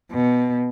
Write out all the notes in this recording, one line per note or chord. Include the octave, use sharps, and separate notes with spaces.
B2